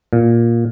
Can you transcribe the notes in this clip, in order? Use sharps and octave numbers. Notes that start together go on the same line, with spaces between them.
A#2